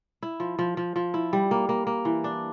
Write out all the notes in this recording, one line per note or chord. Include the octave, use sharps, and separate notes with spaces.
E4
F3
F3
F3
F3
E4
G3
A#3
A#3
A#3
E3
D4